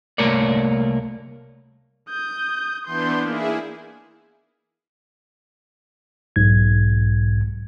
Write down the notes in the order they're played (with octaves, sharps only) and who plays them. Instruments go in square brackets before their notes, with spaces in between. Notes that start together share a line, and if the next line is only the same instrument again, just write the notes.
[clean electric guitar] C2 A3 A#3 A#4 C#5 D5
[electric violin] D#6 G6
[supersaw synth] E3 B3 D4 [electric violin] C6 G6
[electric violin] A#3 D#4 [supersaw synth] E4 G#4
[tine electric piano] B1 G#2 G#6